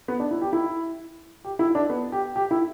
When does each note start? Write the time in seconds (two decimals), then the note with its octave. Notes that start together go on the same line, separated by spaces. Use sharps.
0.08 B3
0.20 D4
0.31 E4
0.42 G4
0.53 E4
1.45 G4
1.59 E4
1.75 D4
1.90 B3
2.12 G4
2.36 G4
2.51 E4